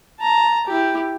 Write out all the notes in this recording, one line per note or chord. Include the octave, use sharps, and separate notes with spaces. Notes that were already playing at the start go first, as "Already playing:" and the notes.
A5 A#5
E4 G4